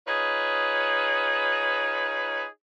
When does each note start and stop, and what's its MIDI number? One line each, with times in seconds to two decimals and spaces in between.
0.07 2.45 63
0.07 2.45 65
0.07 2.45 68
0.07 2.45 71
0.07 2.45 73